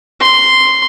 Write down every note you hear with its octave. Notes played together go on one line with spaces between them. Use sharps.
C6